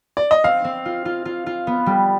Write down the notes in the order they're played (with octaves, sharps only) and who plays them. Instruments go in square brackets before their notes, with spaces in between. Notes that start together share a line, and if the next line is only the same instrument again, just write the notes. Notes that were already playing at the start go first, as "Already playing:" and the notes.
[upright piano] D5
D#5
[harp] C4 [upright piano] F5
[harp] C4
F4
F4
F4
F4
B3
G3